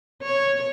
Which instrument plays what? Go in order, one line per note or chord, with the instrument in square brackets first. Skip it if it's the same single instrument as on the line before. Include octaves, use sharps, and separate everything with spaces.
[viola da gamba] C#5